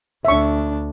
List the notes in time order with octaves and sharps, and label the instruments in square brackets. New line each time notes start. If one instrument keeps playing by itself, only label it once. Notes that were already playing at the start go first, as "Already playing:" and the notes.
[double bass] D2 D4 [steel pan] E5 C#6